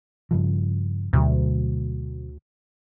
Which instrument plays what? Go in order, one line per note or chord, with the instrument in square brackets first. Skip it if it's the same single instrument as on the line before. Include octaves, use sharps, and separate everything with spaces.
[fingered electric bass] G2 C#3 F3
[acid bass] D2 [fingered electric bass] B2 D3 F#3